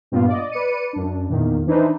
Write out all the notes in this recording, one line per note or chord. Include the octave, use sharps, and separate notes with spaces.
G2 A#2 B3 F4
D5 D#5
B4 D5 C#7 D#7
F#2 D4
E2 A#2 D#3
E3 D4 D#4 B4 C5